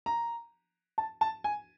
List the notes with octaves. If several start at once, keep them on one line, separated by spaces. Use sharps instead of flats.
A#5
A5
A5
G#5